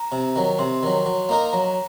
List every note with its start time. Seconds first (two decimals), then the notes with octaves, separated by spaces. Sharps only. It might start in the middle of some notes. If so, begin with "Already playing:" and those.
Already playing: A#5
0.12 C3
0.36 D#3 F#3
0.59 C3 C6
0.83 D#3 F#3
1.06 F#3
1.29 A#3 D#4 A#4
1.53 F#3 A#5